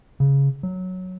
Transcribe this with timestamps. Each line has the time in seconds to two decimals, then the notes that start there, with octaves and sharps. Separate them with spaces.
0.20 C#3
0.63 F#3